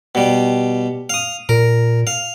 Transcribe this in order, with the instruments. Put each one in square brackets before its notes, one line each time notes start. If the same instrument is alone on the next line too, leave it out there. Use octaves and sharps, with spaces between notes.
[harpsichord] B2 G3
F5 D#6
[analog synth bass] A#2 [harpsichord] A#4
[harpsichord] F5